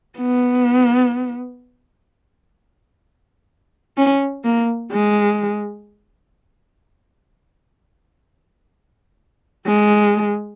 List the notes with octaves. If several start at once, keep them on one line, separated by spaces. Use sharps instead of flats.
B3
C#4
A#3
G#3
G#3